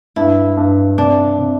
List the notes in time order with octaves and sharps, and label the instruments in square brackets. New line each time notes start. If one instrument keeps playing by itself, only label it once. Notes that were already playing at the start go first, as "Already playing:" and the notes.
[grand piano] G2 [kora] E4
[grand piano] G2
[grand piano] C3 [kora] D4
[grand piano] C3